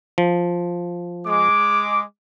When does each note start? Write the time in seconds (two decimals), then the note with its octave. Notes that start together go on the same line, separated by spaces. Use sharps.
0.18 F3
1.26 G#3 D6